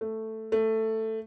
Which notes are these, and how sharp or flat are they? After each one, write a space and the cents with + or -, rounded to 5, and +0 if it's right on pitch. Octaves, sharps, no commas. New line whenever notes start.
A3 +5
A3 +10